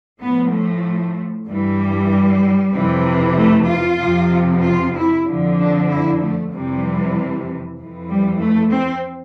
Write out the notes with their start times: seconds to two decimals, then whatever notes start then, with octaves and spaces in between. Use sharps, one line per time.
0.20 A2 F3 B3
0.52 A3
1.47 G2 E3
1.79 G3
2.73 F2 C3 E3
3.37 A3
3.67 F4
4.00 F2 C3 F3
4.62 F4
4.94 E4
5.26 F2 D3 F3
5.58 D4
5.89 E4
6.20 A3
6.52 F2 C3 E3 G3
7.79 F2 E3
8.10 G3
8.42 A3
8.73 C4